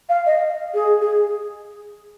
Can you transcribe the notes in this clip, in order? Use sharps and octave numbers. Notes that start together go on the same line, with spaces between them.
F5
D#5
G#4
G#4